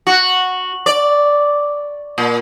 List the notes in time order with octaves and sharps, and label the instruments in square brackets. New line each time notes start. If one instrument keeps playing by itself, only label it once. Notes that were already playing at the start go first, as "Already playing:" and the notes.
[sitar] F#4
D5
A#2